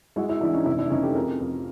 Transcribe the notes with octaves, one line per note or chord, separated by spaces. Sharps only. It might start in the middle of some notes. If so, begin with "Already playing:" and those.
G#3 E4 F#4
E4 F#4
E3 D4 E4
C#4 D#4
F1 D4 E4
D4 E4
F1 C#4 D#4
G4 A4
F2 G#4 A#4
F2